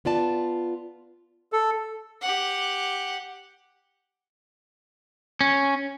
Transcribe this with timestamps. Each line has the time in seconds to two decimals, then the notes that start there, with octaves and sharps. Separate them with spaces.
0.05 B3 F4 D5 A5
1.53 A4
2.22 G4 F#5
5.41 C#4